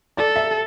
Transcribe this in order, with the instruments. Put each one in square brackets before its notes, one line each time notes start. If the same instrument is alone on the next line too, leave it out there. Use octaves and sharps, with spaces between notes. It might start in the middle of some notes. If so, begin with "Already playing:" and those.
[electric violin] A4 [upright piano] D5
[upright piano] E5